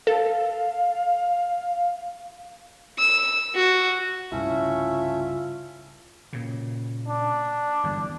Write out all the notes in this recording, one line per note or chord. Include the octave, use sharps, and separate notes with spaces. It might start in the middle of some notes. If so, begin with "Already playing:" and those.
A4 F5
E6
F#4
C2 G2 C#3 A3 C#4 E4 F4 E5
A#2 C#3
D4
G1 E2 G2